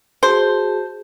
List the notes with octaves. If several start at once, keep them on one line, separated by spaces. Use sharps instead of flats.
F#4 G#4 C5 A5